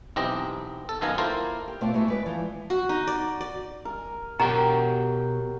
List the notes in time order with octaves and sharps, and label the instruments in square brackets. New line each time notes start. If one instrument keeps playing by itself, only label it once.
[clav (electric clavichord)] B1 E3 C4 G4 D#5 A#5
A4
F#2 D#3 B3 F5 G#5 A#5
A#3 E4 F4 A4 A#4 C5
[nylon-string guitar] G4
B2 A3 C4 F4 C5 D5
A3 B3 E4 F#4 G#4
G#3 B4 D5
E3 F3
[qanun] F#4
D#4
D5
D5
[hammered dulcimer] A#4 G#5
[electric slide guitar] B2 F#4 G5 [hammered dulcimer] F#3 G4 [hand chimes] A#4 [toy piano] A#5